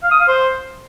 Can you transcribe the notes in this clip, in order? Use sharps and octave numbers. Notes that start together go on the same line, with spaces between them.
F5
D#6
F5
C5